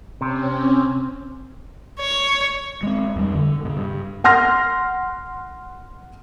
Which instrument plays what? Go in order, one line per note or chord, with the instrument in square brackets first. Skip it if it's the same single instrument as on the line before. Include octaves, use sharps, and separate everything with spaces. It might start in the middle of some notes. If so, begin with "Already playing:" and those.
[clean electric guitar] C3 [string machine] C4 C#4
[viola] C#5
[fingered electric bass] G#3 C4
F2 G3
D3
A#2 C#3
G2
[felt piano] F#5 C6 F6 A#6